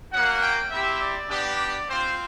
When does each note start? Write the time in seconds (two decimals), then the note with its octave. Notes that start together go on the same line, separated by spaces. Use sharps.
0.12 A#3 C#4 F#4 F#5
0.41 G5
0.70 C4 E4 G4 E5
1.01 D5
1.30 B3 D4 G4
1.89 C4 F4 C5